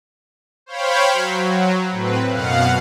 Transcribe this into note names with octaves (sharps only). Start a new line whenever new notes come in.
C5 C#5 F5 G5 B5
F#3
A2 C4 B4
F#2 B2 F5 F#5